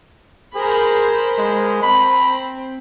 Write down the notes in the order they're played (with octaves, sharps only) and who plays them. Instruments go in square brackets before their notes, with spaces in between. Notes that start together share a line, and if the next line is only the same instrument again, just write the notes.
[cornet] G#4 [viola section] A#4 C5 B5
[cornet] G#3
[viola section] C4 [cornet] B5